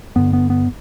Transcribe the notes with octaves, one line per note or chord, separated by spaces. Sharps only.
G2 D3 B3
B3
B3